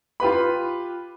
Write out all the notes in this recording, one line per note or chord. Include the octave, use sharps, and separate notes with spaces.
F4 G4 B4 B5